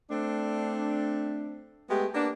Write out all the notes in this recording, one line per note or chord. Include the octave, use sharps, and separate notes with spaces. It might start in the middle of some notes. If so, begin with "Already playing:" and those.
A3 C4 D4
G#3 A3 B3 G4
A#3 B3 D4